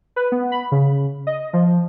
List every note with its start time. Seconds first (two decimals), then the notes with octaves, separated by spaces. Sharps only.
0.16 B4
0.32 B3
0.52 B5
0.72 C#3
1.27 D#5
1.53 F3